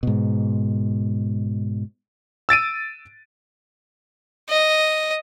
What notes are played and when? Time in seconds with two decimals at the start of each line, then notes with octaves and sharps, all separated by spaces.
0.03 G#2 B2
2.49 E6 A6 D7 D#7
4.49 D#5